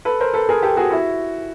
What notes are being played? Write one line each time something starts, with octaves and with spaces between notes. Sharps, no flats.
A4 B4
A#4 C5
A4 B4
G#4 A#4
G4 A4
F#4 G#4
E4 F#4